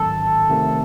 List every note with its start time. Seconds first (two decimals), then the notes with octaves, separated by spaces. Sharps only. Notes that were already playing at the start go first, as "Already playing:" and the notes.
Already playing: A1 G#2 D#3 F#3 C#4 A4
0.49 C3 D#3 A3 C4